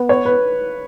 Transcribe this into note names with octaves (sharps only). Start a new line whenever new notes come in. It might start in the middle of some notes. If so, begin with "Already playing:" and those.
Already playing: B3
C#5
B4